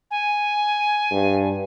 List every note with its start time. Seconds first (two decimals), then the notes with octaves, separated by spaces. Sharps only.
0.11 G#5
1.11 G2